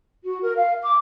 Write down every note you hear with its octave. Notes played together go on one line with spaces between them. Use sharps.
F#4
A#4
F5
D6